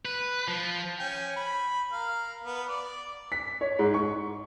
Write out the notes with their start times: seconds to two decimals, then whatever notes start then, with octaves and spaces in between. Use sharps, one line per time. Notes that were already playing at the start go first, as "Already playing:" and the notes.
0.05 B4
0.47 F3
0.99 C#4 G5 G#5
1.36 B5
1.92 A#4 F5
2.44 B3
2.68 D5
3.32 B6
3.61 C#5
3.79 G#2
3.94 C#6